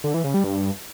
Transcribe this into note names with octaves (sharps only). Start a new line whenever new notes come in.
D3
E3
C#3
G3
G2